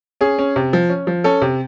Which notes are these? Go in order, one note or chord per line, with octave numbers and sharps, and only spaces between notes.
C#4 G#4
C#4
C3
F3
C#4
F3
C#4 A4
C3